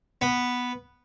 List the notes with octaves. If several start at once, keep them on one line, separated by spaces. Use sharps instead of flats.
B3